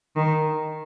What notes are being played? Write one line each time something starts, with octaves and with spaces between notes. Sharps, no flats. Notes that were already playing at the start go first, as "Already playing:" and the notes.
D#3